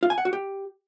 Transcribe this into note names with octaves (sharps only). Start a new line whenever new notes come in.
F4
G#5
F#5
F#4
G4